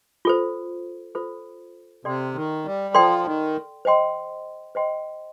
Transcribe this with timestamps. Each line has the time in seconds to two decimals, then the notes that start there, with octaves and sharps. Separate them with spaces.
0.25 F4 A4 C5
1.15 F4 A4 C5
2.05 C3 A4 D5 G5 C6
2.35 D#3
2.65 G3
2.94 F3 A4 D5 G5 C6
3.25 D#3
3.85 C5 D#5 G5 C6
4.75 C5 D#5 G5 C6